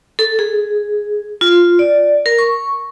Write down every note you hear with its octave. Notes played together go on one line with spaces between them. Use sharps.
A4
G#4
F4
D5
A#4
C#6